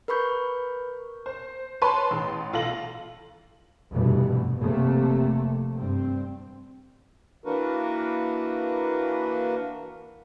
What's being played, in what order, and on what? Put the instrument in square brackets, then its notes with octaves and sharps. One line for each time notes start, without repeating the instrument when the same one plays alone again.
[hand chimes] A#4 B4 B5 C#6 G6
[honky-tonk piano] C5
B4 C#5 A5 B5 C6
A1
B1 F4 A4 A#6 F#7
[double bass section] F1 G2 B2 E3 A3
F1 C3 A3 A#3
G2 C4
[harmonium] E3 A#3 D4 F#4 A#4 B4